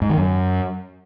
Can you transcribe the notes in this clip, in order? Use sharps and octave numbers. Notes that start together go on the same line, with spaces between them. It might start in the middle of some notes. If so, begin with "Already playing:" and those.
G#2
D#3
F#2